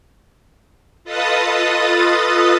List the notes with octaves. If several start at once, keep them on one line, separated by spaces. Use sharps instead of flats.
F4 A4 B4 D#5 A5 D#6